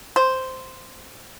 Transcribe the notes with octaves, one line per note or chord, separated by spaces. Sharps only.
C5